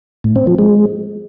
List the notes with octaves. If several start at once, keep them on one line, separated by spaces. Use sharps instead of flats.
A2
C4
F3
G#3